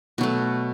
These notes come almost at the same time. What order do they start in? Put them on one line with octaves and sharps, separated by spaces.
B2 F#3 A3